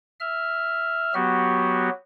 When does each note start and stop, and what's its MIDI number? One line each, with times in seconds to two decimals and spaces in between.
0.20 1.14 76
0.20 1.14 89
1.14 1.89 54
1.14 1.89 59
1.14 1.89 66
1.14 1.89 67